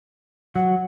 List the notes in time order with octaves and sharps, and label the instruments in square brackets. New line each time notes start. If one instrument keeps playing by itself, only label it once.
[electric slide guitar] F#3 [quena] F#5